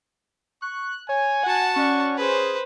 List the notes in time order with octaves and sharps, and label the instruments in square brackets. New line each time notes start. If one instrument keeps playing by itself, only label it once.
[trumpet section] C#6 [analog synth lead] F#6
[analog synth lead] C#5 [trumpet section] G#5
[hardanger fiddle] F#4 A5 [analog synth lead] F#5
[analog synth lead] C#4 [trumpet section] D5 F#5 C#6
[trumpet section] G#4 [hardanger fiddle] B4 C5